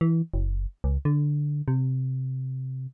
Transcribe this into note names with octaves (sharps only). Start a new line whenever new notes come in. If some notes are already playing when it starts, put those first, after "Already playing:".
E3
F#1
C#2
D3
C3